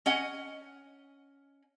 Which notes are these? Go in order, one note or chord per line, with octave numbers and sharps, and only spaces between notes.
C#4 D#5 F#5 G#5